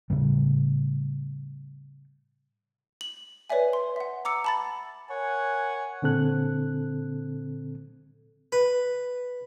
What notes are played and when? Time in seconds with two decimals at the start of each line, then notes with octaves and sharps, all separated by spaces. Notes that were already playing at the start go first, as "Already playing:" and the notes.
0.10 A2 C#3 G3
3.01 F#7
3.50 B4 C#5 D5 E5 G#5
3.73 C6
3.96 E5 F#5
4.25 A#5 D6 E6 C#7
4.44 A5 B5 A6
5.10 A#4 C#5 F#5 G#5
6.02 A#2 D3 C4 A4 F#6
8.52 B4